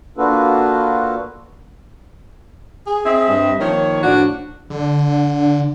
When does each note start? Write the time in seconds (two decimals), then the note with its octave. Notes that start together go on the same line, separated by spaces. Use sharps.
0.17 A#3 D4 F4 F#4 A4 B4
2.86 G#4
3.05 C4 D#5 E5
3.28 G2
3.60 D#3 F3 A#3 C#5
4.03 A2 F3 D4 F#4
4.70 D3